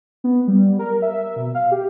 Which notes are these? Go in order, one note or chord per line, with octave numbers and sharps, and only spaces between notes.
B3
G3
A#4
E5
B2
F5
G4